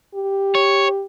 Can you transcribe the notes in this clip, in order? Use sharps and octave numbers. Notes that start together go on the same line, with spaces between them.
G4
C#5